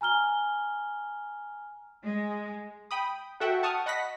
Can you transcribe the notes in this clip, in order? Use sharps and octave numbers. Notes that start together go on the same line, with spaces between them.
G#5 A#5 F6 G7
G#3
G5 B5 D#6
F#4 A4 E5 F#5 G5
F#5 A5 C#6 D#6 F6
D#5 F#5 B5 A#6 B6